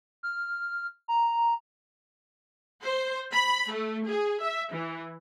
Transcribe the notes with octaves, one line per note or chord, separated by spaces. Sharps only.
F6
A#5
C5
B5
A3
G#4
E5
E3